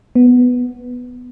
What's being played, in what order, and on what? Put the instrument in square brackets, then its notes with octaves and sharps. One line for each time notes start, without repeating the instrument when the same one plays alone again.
[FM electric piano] B3